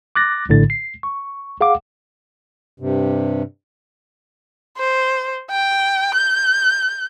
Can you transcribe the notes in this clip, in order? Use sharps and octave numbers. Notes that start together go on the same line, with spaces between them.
D6 F#6 A6 A#6
A#1 A2 D3 A6
C7
C#6
G#4 F5 F#5 D6
G2 C3
C5
G5
G6